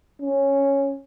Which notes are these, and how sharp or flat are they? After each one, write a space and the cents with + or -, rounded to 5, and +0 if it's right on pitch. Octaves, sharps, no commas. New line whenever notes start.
C#4 -5